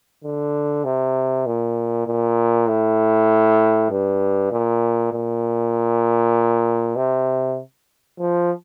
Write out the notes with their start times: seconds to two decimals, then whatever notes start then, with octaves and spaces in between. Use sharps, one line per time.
0.24 D3
0.85 C3
1.46 A#2
2.07 A#2
2.68 A2
3.91 G2
4.52 A#2
5.13 A#2
6.96 C3
8.19 F3